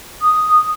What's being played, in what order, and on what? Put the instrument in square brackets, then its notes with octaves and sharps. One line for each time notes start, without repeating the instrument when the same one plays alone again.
[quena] D#6